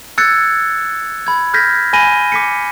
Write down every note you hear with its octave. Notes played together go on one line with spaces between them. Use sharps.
E6 F#6 G#6 A6 C#7
B5 G#6
F6 G6 G#6 A#6 B6
G#5 B5 A#6 D#7 G7
D6 B6 C#7